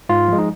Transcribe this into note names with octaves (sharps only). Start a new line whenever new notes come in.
G#2 F4
F3 G#3
D#4